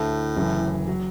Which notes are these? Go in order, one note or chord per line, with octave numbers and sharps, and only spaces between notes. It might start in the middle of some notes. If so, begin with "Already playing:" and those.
Already playing: D2 A2 D3 A3
F#1 F#2 E3
F#3